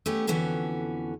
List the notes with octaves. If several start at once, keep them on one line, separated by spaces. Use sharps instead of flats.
A3 B3 C#4 G4
F2 D3 E3 B3 C#4 F#4